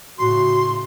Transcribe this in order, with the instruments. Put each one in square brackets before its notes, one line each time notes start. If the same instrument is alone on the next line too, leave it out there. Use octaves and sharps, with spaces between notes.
[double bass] A2 C#3 [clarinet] F#4 [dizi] C6